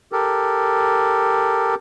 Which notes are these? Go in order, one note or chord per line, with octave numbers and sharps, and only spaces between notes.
G4 A4 A#4